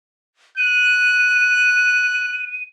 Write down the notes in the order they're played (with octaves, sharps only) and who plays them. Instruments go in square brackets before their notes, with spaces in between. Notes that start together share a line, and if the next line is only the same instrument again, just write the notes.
[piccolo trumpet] F#6 [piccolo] D#7